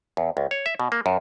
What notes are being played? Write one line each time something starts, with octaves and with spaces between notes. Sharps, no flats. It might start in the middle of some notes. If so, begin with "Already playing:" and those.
E2
C#2
C#5
E5
B2
A#3
F#2